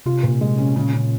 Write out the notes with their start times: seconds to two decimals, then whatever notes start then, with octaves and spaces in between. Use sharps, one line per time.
0.06 C3 F4
0.23 A#2
0.41 G#3
0.58 C#4
0.76 A#2 C#3
0.93 C#3